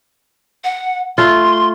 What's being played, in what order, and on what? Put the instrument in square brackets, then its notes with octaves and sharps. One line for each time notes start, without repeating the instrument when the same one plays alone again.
[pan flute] F#5
[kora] A3 F4 [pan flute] C6